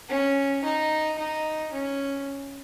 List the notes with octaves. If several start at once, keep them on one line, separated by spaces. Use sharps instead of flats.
C#4
D#4
D#4
C#4